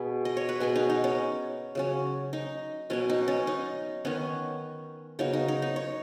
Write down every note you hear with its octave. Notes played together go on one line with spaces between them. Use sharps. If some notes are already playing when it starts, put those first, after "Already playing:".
Already playing: B2 B3 G#4 B4
D#5
C#5
B4
B2 B3 G#4
D#4
D#4
C#4
C#3 F#3 C#4
D#4
B2 F#3 B3 C#4
D#4
C#4
D#4
D#3 B3 C#4
C#3 F#3 B3 D#4
D#4
D#4
D#4
C#5